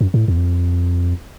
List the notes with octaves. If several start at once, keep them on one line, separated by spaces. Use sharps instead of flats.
F#2
G#2
A2
E2
F2